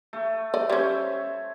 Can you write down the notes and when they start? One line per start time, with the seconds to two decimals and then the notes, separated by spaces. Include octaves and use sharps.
0.13 A3
0.54 D5 D#5
0.70 G3 C#4 C5 C#5 E5